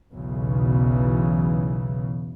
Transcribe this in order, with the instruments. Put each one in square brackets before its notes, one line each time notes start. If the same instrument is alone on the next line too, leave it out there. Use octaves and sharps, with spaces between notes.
[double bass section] B1 E2 C#3 E3